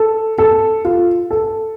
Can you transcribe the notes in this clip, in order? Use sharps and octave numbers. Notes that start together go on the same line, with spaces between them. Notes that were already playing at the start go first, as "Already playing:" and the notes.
Already playing: A4
A4
F4
A4